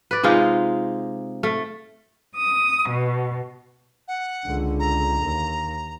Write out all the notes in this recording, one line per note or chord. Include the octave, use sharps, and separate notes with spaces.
B4 D5
C3 G#3 D#4 F4
A3
D#6
B2
F#5
C#2 D3
A#5
D#2